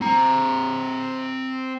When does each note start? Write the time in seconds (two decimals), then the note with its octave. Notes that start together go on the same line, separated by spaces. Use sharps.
0.01 C4 A#5